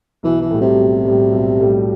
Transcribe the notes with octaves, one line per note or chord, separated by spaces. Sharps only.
B1 E3
E3
A2 G3
C3
B1
A2 G3
B1
A2 G3